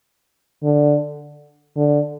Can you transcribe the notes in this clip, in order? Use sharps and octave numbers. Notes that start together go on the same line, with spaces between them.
D3
D3